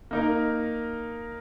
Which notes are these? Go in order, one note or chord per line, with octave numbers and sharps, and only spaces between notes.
A#3 D#4 A#4